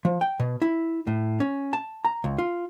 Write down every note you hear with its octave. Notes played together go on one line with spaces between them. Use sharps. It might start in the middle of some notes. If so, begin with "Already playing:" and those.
F3
G5
B2
E4
A2
C#4
A5
A#5
C#2
F4